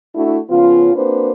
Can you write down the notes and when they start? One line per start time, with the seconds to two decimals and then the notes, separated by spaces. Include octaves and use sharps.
0.15 A3 D4 E4 F#4
0.50 C#3 F3 B3 C#4 F4
0.94 A#3 C4 D4 F#4 B4 C5